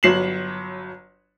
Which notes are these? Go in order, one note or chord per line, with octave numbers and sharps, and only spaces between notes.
G1 F#3 C7 E7 F#7